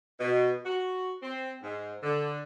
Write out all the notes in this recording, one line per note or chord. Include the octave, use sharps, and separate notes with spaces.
B2
F#4
C4
G#2
D3